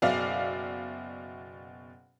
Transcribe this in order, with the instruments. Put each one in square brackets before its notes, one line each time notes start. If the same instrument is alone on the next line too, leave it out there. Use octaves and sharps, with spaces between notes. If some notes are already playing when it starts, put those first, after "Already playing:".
[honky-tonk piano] F#1 B2 D5 E5 F5